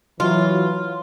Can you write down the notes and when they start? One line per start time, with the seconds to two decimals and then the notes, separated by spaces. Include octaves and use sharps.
0.20 E3 F#3 F4